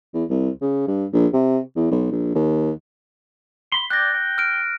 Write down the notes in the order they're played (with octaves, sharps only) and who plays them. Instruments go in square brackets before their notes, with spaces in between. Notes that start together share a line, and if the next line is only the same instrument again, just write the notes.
[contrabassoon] E2
C2
C#3
G2
A#1
C3
E2
B1
A#1
D#2
[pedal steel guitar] B5 C6
[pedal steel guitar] D5 G5 [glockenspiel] F#6 A#6
[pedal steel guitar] G5
[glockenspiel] F6 D7